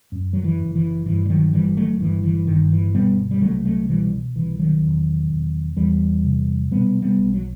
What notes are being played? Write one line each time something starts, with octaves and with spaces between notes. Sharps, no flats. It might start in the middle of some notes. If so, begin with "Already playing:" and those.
F#2
F#3
E3
F#1
E3
G2 E3
G3
D#3 F#3
G1 E3 G3
F#3 A3
G2 E3
E3
G1 D#3
E3
B2 G3 B3
G3
C2 F#3 A3
F#3 A3
B2 E3 G3
C2 E3
D#3 F#3
E1
E1
E2 E3 G3
C3
B2 G3 B3
G3 B3
B1
F#3